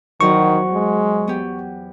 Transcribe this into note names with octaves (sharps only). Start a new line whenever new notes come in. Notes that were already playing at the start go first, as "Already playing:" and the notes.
E2 D#3 F#3 C5 C#6
G#3
B3 G4